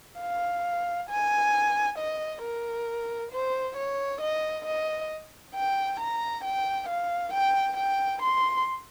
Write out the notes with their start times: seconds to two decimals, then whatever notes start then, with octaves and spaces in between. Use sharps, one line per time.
0.20 F5
1.10 G#5
1.99 D#5
2.43 A#4
3.32 C5
3.77 C#5
4.21 D#5
4.66 D#5
5.55 G5
6.00 A#5
6.44 G5
6.89 F5
7.33 G5
7.77 G5
8.22 C6